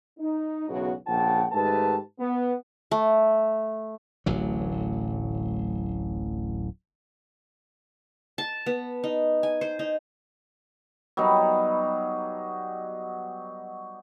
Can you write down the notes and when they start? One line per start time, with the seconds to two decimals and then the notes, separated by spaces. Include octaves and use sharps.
0.19 D#4
0.68 B1 E2 A2 C#3 B3 F#4
1.07 A#1 C#3 F3 F#5 G5 A5
1.52 G#2 D#3 A3 G4 B4 A5
2.19 B3
2.91 A3
4.26 D1 A1 F#3
8.38 A5
8.66 B3
9.04 D#4
9.43 G#5
9.61 C5
9.79 D#4
11.17 F#3 G3 B3 D#4